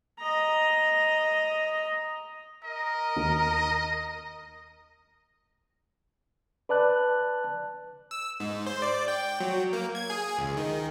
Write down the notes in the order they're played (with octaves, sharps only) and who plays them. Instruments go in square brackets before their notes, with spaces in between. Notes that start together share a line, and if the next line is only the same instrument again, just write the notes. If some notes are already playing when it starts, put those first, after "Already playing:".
[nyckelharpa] D#5 A#5
[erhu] A#4 [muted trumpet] D#5
[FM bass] D#2
[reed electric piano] B4 D5 A5 F#6
[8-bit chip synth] E6
G#2
C5
D5
G5
F#3
A#3
G#6
G#4
C#2
D#3